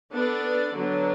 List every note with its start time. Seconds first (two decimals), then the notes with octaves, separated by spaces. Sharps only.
0.12 B3 D4 A4 D5
0.74 D3 F#3 B3 D4